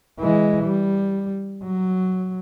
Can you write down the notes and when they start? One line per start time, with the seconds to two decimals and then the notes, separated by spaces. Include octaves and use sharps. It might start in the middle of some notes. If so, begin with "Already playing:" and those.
0.20 E3 G#3
0.64 G3
1.64 F#3